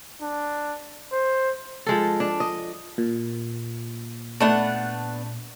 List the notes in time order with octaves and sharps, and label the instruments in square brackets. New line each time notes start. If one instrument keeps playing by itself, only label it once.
[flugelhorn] D4
C5
[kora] F3 G#3 A4
D4
D#5
[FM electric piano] A#2
[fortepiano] A3 [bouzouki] B3 D4 F#5